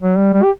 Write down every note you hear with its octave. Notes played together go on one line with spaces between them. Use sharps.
F#3
G3
G3
G4